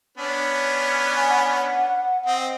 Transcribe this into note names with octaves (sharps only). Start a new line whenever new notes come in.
B3 C#4 D4
G#5
F#5
C4 D#5